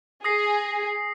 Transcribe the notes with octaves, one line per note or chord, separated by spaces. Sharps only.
G#4 D#6 A#6 C7